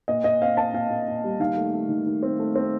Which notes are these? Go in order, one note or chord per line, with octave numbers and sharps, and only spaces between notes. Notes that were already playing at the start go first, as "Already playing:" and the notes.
A#2 D#5
A#2 D#5
C4 F5
C4 A5
A#2 F5
A#2
A#2
G3
D#3 F5
A3
A3
D#3
D#3
C4
A3
C4